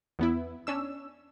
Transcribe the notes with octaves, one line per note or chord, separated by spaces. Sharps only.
E2 B3 E4
C#4 D4 E6